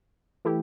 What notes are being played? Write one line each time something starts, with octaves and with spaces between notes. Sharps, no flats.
E3 A3 E4 G4